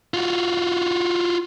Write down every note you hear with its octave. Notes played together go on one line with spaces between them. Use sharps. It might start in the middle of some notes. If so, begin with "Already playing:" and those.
F4 F#4